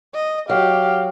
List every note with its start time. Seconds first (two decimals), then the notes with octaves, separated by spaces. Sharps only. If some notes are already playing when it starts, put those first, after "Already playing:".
0.14 D#5
0.50 F#3 G4 F5